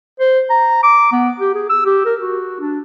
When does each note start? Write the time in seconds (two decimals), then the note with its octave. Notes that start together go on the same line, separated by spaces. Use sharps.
0.20 C5
0.50 A#5
0.83 D6
1.12 B3
1.40 G4
1.55 G#4
1.70 E6
1.86 G4
2.06 A#4
2.20 F#4
2.61 D4